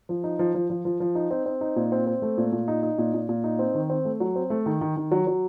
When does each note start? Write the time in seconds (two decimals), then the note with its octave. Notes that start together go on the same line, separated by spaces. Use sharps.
0.09 F3
0.24 D#4
0.39 F3
0.54 F3
0.70 F3
0.85 F3
1.00 F3
1.15 D#4
1.31 C4
1.46 C4
1.61 D#4
1.76 A#2
1.92 C4
2.07 C4
2.22 A3
2.38 A#2
2.52 A#2
2.68 D#4
2.83 D#4
2.98 A#2
3.14 A#2
3.29 A#2
3.44 D#4
3.59 C4
3.74 D#3
3.90 C4
4.05 A3
4.20 F#3
4.36 C4
4.50 A3
4.66 D#3
4.81 D#3
4.96 D#3
5.11 F#3
5.27 F#3